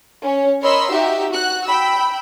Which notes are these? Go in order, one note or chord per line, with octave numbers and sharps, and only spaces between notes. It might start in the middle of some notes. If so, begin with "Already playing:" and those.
C#4 C#5
A#4 C#5 D#5 B5 C6 E6
D#4 F#4 G4 E5
F#4 F#6
G5 B5 E6